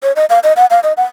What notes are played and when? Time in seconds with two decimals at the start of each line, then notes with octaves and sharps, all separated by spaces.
0.03 C#5
0.16 D#5
0.30 F5
0.44 D#5
0.57 F#5
0.70 F5
0.83 D#5
0.97 F#5